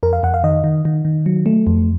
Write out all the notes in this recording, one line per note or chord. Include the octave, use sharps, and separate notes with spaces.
F2 A#4
F5
F2 F#5
F5
D#3 D#5
D#3
D#3
D#3
F#3
A3
F2